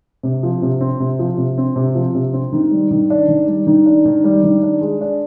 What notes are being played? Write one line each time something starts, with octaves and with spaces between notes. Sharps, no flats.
C3
F3
C3
C4
C3
F3
C3
C4
C3
F3
C3
C4
D#3
G3
D#3
D4
D#3
G3
D#3
D4
D#3
G3
D#3
D4
G#3
D4